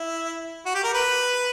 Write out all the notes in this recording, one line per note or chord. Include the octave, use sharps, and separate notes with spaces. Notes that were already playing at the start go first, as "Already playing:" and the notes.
Already playing: E4
F#4
G4
A#4
B4